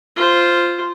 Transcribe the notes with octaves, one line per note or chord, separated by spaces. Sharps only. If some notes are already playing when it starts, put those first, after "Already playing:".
F4 C5